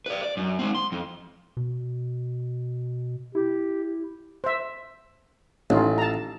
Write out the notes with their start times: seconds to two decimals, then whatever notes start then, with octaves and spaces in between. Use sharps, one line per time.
0.06 B4 D5
0.23 D5
0.37 F#2
0.59 G#3 C4
0.75 C6
0.92 F2
1.57 B2
3.35 E4 G4
4.44 C5 E5
5.70 A1 C#4 D#4 F4
5.98 A5 A#5